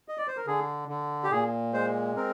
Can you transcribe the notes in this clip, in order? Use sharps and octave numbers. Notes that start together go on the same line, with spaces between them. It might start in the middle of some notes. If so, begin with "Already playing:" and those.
D#5
D5
C5
A#4
D3 G#4
D3
G4
A#2 G#4
G#3 C5
C4 A#4